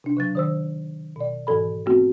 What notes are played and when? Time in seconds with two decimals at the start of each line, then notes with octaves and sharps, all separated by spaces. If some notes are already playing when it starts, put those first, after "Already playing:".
0.04 C3 D4
0.17 C#3 F#3 A6
0.35 D#3 C5 E6
1.16 B2 D5
1.47 G#2 E3 A4 B5
1.86 A3 B3 C4 F#4